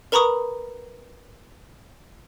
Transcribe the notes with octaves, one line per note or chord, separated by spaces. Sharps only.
A#4 B4 A#5 B5 C#6 D#6